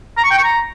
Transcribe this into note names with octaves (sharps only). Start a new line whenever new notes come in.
A#5
C#6
G5
C#6
A#5